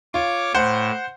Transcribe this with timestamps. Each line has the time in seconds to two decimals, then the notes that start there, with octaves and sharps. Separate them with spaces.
0.14 F4 C#5 D6
0.54 A2 C5 F#5